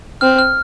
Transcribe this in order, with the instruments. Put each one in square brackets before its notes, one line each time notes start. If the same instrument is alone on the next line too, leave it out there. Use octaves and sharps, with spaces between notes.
[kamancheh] C4 [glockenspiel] F6
[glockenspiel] F6